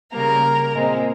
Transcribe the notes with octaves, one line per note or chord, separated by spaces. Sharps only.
C#3 G3 A#3 A#4
A#2 G#3 C4